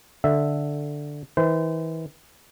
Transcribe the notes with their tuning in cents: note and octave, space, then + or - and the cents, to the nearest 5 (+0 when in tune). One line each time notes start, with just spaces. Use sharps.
D3 +0 E5 +0
E3 -35 C5 -35